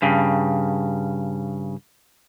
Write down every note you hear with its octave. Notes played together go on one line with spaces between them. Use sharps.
G2 C#3